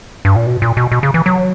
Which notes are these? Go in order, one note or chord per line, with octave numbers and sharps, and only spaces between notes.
G2
A#2
B2
A#2
B2
B2
C#3
E3
F#3